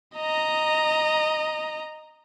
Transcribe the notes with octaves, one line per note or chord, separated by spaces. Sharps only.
D#5 A#5